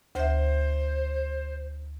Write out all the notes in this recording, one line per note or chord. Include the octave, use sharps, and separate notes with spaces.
D2 C5 E5